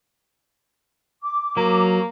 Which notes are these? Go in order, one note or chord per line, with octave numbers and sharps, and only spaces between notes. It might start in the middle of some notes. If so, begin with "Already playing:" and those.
D6
F#3 A#3